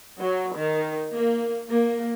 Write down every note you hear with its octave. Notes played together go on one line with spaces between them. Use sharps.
F#3
D#3
A#3
A#3